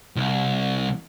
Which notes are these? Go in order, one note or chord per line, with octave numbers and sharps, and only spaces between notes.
C2